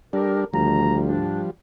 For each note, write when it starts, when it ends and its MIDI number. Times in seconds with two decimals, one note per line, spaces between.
0.13 0.45 55
0.13 0.45 62
0.13 0.43 67
0.13 0.43 69
0.13 0.43 70
0.53 1.24 38
0.53 0.96 51
0.53 1.51 53
0.53 1.51 55
0.53 0.96 57
0.53 0.96 82
1.07 1.42 44
1.07 1.42 62